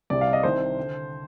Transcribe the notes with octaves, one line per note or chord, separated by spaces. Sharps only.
C2 C3 G3 D5
F5
D#5
C2 C3 D#3 C5
D3